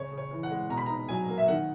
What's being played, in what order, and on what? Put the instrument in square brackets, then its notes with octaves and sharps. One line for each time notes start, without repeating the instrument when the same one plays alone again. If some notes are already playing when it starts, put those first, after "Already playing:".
Already playing: [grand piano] C#3 C#5
C#3
C#5
E3
F#5
G#3
B2 A#5
B5
D#4 A#5
F#3 G#5
A#3
E5
D#3 F#5